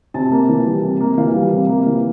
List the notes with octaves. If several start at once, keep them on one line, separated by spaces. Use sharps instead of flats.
C3 A5
A#3
E3
G3
C3
A#3
E3 F5
G3
C3
A#3
E3